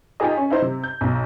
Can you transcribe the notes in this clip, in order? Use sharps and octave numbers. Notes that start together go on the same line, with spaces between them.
D#4 F4 G4 G#4 D#5
C#4
D#4 E4 C5
C3
G6
B1